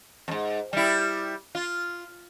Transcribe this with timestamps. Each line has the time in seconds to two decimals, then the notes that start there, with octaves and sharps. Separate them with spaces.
0.28 F2 G#2
0.73 G3 E4
1.55 F4